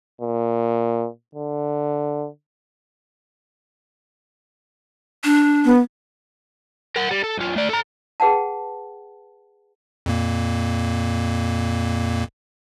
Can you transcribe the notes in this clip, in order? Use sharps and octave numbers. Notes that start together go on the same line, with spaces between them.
A#2
D3
D4
B3
A#4 F#5
G3
A4
B1 F4
A3 D5
A4 A#5
G#4 B4 F#5 G5 A5
F2 A#2 A#3